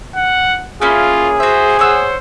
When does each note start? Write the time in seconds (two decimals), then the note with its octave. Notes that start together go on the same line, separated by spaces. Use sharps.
0.16 F#5
0.81 A#3 C#4 E4 F4 G#4
1.40 F#4 C5 E5
1.79 C5 C#5 F#5 E6